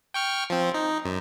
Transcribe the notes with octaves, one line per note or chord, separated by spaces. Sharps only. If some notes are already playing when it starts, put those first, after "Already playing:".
G5 C#6 F6
F3 C4
D#4
F#2